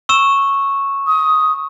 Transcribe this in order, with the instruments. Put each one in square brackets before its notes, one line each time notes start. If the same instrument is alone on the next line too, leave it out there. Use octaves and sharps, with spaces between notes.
[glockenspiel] C#6 E6 E7
[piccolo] D#6